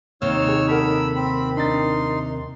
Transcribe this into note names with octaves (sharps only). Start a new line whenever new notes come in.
D#2 C3 D#4 C#5 E6 F6
G#4
A4 A#4 F#5 B5 E6
C4 B5
A#4
D4 D#4 C6 A6